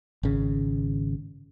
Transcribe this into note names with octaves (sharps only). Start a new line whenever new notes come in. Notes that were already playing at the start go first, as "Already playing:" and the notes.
G#1 C#3